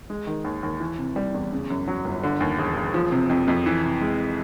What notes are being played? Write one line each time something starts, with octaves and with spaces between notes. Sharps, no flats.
G#3
D#3
D#2
D#2
E3
C3
G3
E2
C#3
F#2
F#3
G1
D3
D#2
E1
E1
F3
C3
F2
F2
E3
C3
G#3